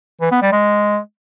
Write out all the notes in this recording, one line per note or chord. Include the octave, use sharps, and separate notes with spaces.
E3
B3
G3
G#3